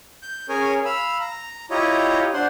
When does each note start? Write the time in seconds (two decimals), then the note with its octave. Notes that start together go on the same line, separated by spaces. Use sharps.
0.23 G6
0.49 C#4 G#4 A#4 C#5 G#5
0.85 F5 B5 E6
1.21 A#5
1.71 E4 F4 G4 C#5 D#5 A#5
2.34 D4 C5 F#5 C6